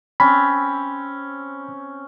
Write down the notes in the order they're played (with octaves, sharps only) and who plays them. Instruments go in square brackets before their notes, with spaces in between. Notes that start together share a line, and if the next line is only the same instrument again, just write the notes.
[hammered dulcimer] C4 C#4 [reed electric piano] B5